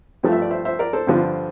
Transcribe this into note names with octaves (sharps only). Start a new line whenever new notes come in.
G2 F3 A3
E5
D5
C5 E5
C5 E5
A#4 D5
A4 C5
G2 D3 F3 C4